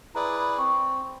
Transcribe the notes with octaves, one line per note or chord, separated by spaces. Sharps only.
E4 G#4 B4 D5 A#5
B5
C4 C#6